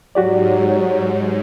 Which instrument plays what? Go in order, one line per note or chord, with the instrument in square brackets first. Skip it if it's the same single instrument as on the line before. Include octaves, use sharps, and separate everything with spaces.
[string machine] G#2 [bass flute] F#3 [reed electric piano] F#4 G4 D5